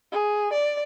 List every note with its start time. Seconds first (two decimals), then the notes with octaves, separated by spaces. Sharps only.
0.12 G#4
0.53 D5